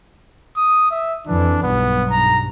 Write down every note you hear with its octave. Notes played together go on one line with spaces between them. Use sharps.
D#6
E5
F2 E3 D4
B1 G2 B3
A#5